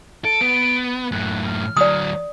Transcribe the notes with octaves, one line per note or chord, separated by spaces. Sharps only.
A4 D7
B3
F#2 A2 F#6
F6
D2 F#3 D5 D#6